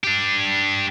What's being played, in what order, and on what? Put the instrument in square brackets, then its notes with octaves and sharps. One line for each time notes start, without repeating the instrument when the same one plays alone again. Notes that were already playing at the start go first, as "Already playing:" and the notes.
[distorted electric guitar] D4 G4